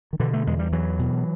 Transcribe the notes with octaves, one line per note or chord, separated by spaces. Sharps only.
D#3
B2 D3 E3
A3
E2 G#3
G3
E2 E3 F#3
B2